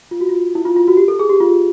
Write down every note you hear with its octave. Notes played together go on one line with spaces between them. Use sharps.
F4
F#4
F4
E4
F4
F4
F#4
G4
A4
G#4
G4
F4